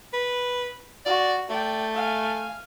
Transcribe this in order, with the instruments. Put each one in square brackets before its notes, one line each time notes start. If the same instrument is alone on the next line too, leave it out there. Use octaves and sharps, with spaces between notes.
[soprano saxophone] B4
[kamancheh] F#4 [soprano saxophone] D5
[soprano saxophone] A3 [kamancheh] D5 G5
[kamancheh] F5 G#5